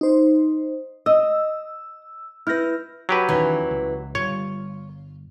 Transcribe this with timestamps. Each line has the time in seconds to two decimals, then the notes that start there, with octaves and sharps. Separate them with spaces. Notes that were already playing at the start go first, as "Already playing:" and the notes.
0.01 D#4 C5
1.06 D#5 E6
2.47 E4 B4 F6 G6 A#6
3.09 F#3 G4 B4
3.29 E2 D#3 E3 C#4
3.71 C#2
4.15 G1 G2 G3 F4 C#5